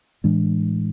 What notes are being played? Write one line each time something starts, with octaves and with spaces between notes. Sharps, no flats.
A2 E3 G#3 D4